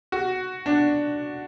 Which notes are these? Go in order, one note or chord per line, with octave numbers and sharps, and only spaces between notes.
F#4
D4